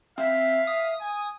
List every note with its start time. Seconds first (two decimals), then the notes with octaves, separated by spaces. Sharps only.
0.18 C4 E5 F5
0.67 D#6
1.00 G#5